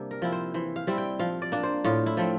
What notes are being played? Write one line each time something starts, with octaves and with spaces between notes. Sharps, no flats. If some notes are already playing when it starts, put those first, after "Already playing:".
Already playing: C3 G3 A#3 D4
A#4
F3 C4 E4
C5
E3 C5
F5
G3 C4 E4
G5
F3 F5
D5
A#3 D4
C5
A2 F4
E4
F3 A3 C4